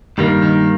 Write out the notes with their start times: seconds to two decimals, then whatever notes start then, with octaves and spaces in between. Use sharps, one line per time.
0.18 G2 D#3 G3 A#3
0.42 D#3